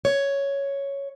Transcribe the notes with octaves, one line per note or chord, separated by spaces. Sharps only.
C#5